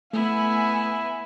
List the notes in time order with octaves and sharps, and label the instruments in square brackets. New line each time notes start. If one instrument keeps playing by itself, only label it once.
[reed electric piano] A3 [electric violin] B3 G#5 [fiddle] E4 [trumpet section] E5